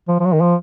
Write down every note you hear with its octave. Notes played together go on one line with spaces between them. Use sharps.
F3
F3
F#3
D#3
F3